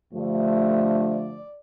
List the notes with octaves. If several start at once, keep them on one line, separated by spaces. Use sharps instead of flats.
G2 D3 F3 A3
D5